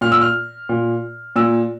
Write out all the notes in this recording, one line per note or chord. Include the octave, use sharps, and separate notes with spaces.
A#2 F6
E6
F6
A#2
A#2 E6